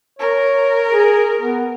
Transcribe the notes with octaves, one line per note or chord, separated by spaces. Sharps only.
A#4 C#5
G#4
B3